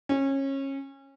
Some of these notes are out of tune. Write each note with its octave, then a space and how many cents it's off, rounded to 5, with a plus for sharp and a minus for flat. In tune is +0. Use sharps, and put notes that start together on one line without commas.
C#4 -25